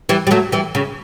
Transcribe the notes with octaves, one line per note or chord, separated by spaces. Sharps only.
E3 G3
G3
F#3 A3
E3 G3
C#3